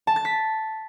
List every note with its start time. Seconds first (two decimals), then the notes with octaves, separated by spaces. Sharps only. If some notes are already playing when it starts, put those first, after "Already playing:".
0.07 A5
0.16 A6
0.25 B6